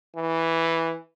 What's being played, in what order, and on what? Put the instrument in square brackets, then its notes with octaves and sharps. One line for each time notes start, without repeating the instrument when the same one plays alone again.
[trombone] E3